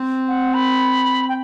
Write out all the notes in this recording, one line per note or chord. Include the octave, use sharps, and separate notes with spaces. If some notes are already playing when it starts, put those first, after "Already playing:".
Already playing: C4
F#5
B5
G5